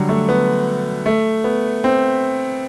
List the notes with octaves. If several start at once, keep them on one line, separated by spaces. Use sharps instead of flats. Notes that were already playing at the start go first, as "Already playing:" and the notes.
Already playing: D3 F#3 G3
A3
B3
A3
B3
C4